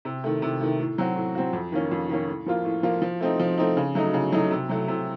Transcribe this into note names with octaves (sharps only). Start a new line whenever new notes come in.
C3
D#3 A3
C3
D#3 A3
A2
F#3 C4 F#4
A2
F#3 C4 F#4
F2
D#3 A#3 C#4
F2
D#3 A#3 C#4
A2
F3 A#3 F4
A2
F3 A#3 F4
F3
A3 C4 D#4
F3
A3 C4 D#4
C#3
F#3 A3 D#4
C#3
F#3 A3 D#4
C3
F#3 A3
C3